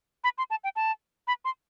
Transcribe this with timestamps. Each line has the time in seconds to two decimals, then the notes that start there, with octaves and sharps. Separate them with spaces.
0.24 B5
0.38 C6
0.50 A5
0.64 G5
0.76 A5
1.27 B5
1.45 C6